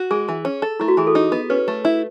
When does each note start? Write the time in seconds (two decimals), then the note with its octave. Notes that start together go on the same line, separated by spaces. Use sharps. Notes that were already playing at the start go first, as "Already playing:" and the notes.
Already playing: F#4
0.11 G#3 G#4
0.29 E3
0.45 C#4
0.62 A4
0.80 A3 E4
0.88 F#4
0.97 E3 G#4
1.07 A4
1.15 D#4
1.32 B3
1.50 C#4 B4
1.68 A3
1.85 E4